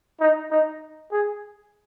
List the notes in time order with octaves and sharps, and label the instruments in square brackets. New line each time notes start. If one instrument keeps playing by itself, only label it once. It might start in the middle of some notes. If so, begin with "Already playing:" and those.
[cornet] D#4
D#4
G#4